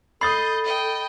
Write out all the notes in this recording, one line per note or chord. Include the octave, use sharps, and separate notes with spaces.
A4 D#5 B5 D#6 G6 A6 C7
D#5 G5